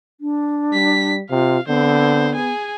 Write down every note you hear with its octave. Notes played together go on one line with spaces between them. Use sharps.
D4
G3 B6
C3 F4 F5
D3 B3 C4 C5
G#4 G#5